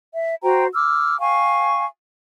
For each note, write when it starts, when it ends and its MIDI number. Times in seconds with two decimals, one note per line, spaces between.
0.14 0.35 76
0.42 0.65 66
0.42 0.65 72
0.42 0.65 79
0.42 0.65 82
0.74 1.18 86
0.74 1.18 88
0.74 1.18 89
1.19 1.85 77
1.19 1.85 79
1.19 1.85 80
1.19 1.85 85